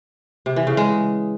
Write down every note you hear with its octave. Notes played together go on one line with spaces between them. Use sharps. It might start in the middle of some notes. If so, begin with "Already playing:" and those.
C3
E3
C#3
G#3